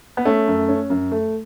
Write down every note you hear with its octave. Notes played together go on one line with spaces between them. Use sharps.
B3
A3 C#4
F#2
C#4
F#2
A3